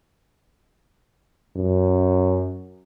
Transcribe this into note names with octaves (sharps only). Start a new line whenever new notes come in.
F#2